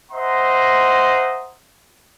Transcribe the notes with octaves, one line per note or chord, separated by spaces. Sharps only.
C5 D#5 E5 F#5 A#5 C6